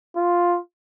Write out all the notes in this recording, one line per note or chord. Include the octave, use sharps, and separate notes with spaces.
F4